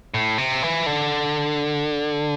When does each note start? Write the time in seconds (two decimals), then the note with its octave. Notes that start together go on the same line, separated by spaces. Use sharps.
0.14 A2
0.38 C3
0.63 E3
0.86 D3